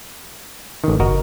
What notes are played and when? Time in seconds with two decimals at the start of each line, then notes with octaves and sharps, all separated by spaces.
0.84 A1 D#3
1.00 F#1 F#4 A#4 D#5